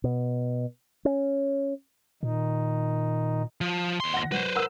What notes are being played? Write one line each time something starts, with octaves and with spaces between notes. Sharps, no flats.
B2
C#4
A#2 D#3 D#4
F3
D#2 C6
F#5 A#6
F#3 B4 C5
A#4 F#5 E6